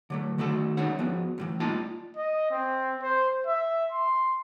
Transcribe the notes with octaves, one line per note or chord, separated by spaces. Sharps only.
D3 F#3 A3
D#3 A3 F#4 A4
G#3 D4 D#4 C#5 F#5
F3 B3 F#4
E2 A2 E3
G3 A3 A#3 D#4 F4 A5
D#5
C4
C5
E5
C6